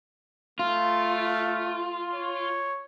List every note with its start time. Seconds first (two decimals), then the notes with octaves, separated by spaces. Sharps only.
0.59 A3 F4
2.13 C#5